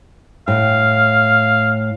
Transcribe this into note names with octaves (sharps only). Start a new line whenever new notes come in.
A2 F5